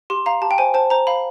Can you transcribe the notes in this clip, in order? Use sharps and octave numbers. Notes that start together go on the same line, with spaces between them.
G4 C6
F5 A#5
G4 A5
G5
C5 G#5
C5 A5
C5 A#5
F5 B5